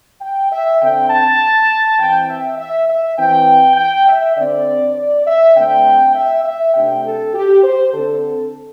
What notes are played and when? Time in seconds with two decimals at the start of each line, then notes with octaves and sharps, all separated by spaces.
0.21 G5
0.51 E5
0.81 D3 C4 G5
1.10 A5
1.99 E3 C4 G5
2.30 E5
2.58 E5
2.89 E5
3.17 E3 C4 G5
3.77 G5
4.07 E5
4.37 D3 C4 D5
4.96 D5
5.26 E5
5.56 D3 A3 C4 G5
6.15 E5
6.45 E5
6.74 C3 A3 D4 G5
7.04 A4
7.34 G4
7.64 C5
7.93 D3 A4
7.98 C4